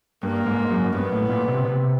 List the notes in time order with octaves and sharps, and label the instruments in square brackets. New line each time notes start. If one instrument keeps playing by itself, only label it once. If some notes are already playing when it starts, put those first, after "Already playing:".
[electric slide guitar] G2 [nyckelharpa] A#3
[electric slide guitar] G#2
F#2
[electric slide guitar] G2 [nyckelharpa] B3
[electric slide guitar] A2
A#2
C3
C3